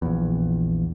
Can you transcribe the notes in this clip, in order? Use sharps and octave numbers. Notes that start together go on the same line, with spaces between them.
A#1 E2